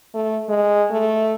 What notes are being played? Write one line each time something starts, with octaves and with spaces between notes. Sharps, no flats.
A3
G#3
A3